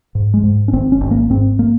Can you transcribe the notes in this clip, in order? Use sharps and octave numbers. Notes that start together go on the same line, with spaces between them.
G#2
G#3
G#2
C#4
G#1 C4
C#4
G#1
A#3
G#2 C4
A#3